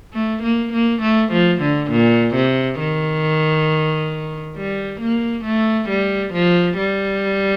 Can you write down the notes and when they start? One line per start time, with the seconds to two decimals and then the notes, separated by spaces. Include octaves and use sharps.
0.14 A3
0.43 A#3
0.73 A#3
1.02 A3
1.32 F3
1.61 D3
1.91 A#2
2.35 C3
2.79 D#3
4.56 G3
5.00 A#3
5.45 A3
5.89 G3
6.34 F3
6.78 G3